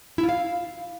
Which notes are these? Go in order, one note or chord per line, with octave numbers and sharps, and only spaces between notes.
E4
F4
F5